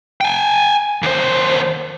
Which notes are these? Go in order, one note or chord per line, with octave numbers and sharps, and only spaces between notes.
G5 G#5
D#2 C5